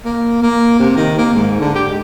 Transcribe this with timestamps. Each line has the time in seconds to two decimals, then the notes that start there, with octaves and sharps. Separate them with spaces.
0.05 A#3
0.43 A#3
0.80 C3
0.96 D#3
1.18 A#3
1.34 G#2
1.60 D3
1.75 G4
1.89 G#3